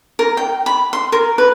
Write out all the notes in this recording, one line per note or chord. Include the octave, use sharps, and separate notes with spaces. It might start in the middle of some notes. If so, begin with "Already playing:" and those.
A#4
G5
B5
C6
A#4
B4